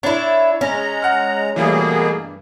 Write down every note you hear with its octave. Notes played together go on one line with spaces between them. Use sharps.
D4 E4 C#5
G#3 C#4 A#5
F#5 F6
B2 E3 G3 A3 A#3 G#4
G2